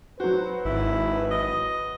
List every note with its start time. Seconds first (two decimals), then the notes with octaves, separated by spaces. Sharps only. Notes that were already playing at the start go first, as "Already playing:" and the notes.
0.20 F#3 F#4 B4 C5
0.65 G#1 E4
1.31 D#5